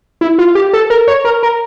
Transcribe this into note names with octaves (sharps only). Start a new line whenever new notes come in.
E4
F4
G4
A4
A#4
C#5
A#4
A#4